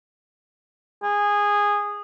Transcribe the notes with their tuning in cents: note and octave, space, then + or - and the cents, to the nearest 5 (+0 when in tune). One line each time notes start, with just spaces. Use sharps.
G#4 -15